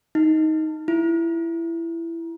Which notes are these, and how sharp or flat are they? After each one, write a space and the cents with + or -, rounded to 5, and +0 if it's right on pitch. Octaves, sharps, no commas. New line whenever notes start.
D#4 +15
E4 +15